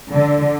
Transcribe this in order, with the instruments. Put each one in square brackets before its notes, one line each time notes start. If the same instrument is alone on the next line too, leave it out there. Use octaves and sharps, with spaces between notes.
[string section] D3